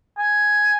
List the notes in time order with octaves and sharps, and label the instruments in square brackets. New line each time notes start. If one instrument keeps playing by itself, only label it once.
[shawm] G#5